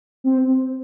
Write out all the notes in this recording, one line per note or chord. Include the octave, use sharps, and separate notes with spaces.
C4